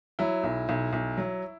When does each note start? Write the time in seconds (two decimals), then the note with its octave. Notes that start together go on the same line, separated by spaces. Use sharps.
0.19 F#3 E4
0.44 B1
0.69 B1
0.93 B1
1.18 F#3